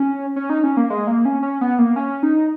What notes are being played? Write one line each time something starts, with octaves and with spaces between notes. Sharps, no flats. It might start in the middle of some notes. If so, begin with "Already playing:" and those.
Already playing: C#4
C#4
D#4
C#4
A#3
G#3
A#3
C#4
C#4
B3
A#3
C#4
D#4